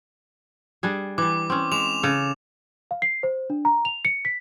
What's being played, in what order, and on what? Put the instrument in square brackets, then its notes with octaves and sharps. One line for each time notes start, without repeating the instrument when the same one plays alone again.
[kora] G3 D4 G#4
[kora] E3 G3 [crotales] D6
[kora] C4 C#4
[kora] G#3 [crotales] D6 E7 F7
[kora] C#3 A4
[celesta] F5
C7
C5
D4
A#5
F7
C#7
B6